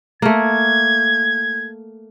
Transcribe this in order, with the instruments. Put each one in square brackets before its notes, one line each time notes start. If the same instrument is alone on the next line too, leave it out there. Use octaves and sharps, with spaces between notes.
[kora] A3 A#3 [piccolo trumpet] G#6